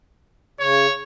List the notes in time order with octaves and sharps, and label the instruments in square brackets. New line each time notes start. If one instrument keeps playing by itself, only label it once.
[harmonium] C#3 [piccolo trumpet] C#5